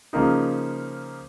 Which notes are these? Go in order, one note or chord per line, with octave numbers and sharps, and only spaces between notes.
C#3 F3 A#3 D#4